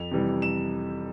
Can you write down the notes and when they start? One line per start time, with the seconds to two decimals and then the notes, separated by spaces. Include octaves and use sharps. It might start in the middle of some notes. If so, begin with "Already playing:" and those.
Already playing: F2 F7
0.11 C3 E3 G3
0.42 E7